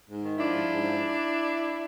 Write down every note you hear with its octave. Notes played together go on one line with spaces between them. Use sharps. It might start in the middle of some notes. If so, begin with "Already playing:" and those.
G#2
D#3
F3 D4 E4
G#2
G#2
F3